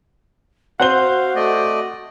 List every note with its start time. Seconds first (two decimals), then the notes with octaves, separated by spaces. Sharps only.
0.80 C4 F#4 C5 F5 F#5 G7
1.35 A3 D5 D#5